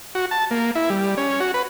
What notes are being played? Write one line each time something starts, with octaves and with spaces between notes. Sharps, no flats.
F#4
A5
A#3
E4
G3
C#4
F#4
B4